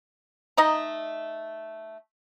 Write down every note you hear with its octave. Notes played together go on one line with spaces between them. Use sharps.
A3 D#4 D#5 A#5